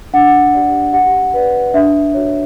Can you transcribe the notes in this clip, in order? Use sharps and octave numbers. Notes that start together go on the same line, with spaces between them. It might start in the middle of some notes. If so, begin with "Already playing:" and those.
D4 F#5
G4 D5
G4 F#5
B4 D5
D4 E5
F#4 C#5